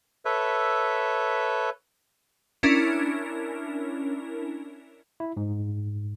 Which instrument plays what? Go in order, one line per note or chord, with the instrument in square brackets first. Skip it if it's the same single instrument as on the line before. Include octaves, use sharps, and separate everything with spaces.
[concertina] A4 B4 C#5 E5
[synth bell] C#4 D4 E4 A#4
[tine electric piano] E4
G#2